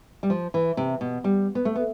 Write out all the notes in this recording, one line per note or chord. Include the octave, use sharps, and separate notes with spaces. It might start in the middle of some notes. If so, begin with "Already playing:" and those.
G3
F3
E3
C3
B2
G3
B3
A3
B3